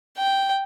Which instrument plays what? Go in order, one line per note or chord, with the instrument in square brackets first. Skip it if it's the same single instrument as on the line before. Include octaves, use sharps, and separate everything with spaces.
[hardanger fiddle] G5